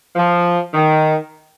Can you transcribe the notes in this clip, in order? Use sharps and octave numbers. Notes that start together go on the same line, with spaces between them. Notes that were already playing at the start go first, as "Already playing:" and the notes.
F3
D#3